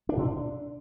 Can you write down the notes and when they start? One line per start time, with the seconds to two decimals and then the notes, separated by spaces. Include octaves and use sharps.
0.09 D4
0.17 B2
0.25 D4